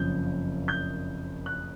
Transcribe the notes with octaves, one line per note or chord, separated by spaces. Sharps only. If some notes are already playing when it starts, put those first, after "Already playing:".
Already playing: F#1 F2 C#3 F3 G6
G6
F#6